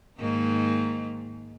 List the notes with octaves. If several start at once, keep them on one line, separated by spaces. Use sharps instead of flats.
G#2 D#3 A#3